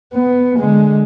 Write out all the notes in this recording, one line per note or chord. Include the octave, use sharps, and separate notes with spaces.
B3
D3 G#3